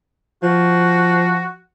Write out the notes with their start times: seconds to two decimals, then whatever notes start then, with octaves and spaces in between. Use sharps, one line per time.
0.43 F3 F#4